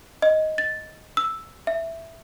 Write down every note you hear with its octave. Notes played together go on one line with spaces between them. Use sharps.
D#5
A6
E6
E5